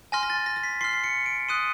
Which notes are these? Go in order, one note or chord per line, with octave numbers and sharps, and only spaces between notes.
G#5 C6 F6 A#6
A#6
A6
A#6
A#6
B6
C6 F6 C7
C7
C#7
D7
C6 D#6 F#6 D#7